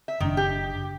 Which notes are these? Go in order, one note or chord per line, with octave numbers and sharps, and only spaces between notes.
E5
F#1 C3 D#3 D4
G4